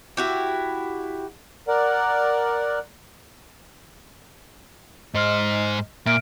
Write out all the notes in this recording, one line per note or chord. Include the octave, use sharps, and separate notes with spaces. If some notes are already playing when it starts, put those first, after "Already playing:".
E4 F#4 G4
A#4 D5 F#5
G#2 C5 D#5 F6
A#2 E5 F6 D7